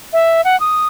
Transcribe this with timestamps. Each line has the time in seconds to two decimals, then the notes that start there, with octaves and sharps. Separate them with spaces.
0.13 E5
0.45 F#5
0.60 D#6